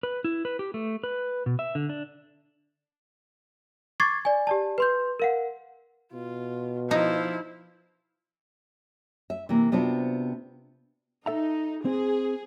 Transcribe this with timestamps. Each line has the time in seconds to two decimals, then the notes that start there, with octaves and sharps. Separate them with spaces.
0.03 B4
0.24 E4
0.45 B4
0.59 G4
0.74 A3
1.04 B4
1.46 B2
1.59 E5
1.75 D3
1.89 D4
4.00 C#6 D6 G#6 A6 C7
4.25 D5 G#5
4.47 G4 D5 A5
4.78 B4 C6 G6
5.20 A#4 F5 F#5
6.13 B2 F4
6.91 F3 D#4 E4
9.30 E5
9.49 C3 E3 A#3
9.72 C3 B3 C4 D4 F4 F#4
11.26 D#4 A4 E5 A#5
11.85 C4 G#4